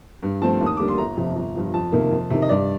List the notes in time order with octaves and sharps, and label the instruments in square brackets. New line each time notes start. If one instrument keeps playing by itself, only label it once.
[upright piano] G2
F3 A3 C4 A5
D#2
D#6
D3 G3 A#3 D4 D6
C6
G1 A#5
F2 C3 F3
G1
G2 F3
F2 A5
C3 D#3 A#3
F2
C3 D#3
D#5
G2 D5